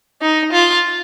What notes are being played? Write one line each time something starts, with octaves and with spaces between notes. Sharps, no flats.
D#4
F4